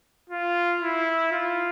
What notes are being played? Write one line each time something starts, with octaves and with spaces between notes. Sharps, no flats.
F4
E4
F4